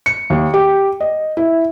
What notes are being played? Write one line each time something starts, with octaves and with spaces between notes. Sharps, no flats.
C#7
D#2
G4
D#5
E4